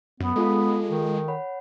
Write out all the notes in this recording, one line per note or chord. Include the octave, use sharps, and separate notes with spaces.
F#2 B3
G#3 F4 G#4 A4
D#3
C#5 F#5 B5